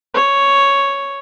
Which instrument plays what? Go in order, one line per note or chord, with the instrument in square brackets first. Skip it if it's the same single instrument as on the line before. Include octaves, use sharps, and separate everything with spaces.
[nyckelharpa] C#5